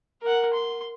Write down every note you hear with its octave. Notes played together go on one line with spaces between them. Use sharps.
A#4 F#5
C6